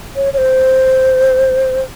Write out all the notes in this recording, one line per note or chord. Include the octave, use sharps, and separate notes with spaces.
C#5
C#5
C5